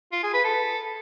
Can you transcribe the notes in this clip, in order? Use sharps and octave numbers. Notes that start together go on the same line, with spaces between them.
F4
G#4
B4
A4